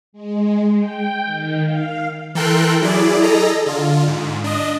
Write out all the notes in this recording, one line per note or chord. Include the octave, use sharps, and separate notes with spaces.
G#3
G5
D#3
F5
E3 A4 A#4 G5 C6 F#6
F#3 E4 G#4 D5
G#4 A4 D#5 A#5
D3 F4
G#2
D4 D#5